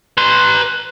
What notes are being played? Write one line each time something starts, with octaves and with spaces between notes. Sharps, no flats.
B4 C6